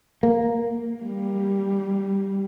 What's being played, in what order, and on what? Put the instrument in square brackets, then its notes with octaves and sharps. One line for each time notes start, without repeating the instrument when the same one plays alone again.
[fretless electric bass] A#3
[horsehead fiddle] G3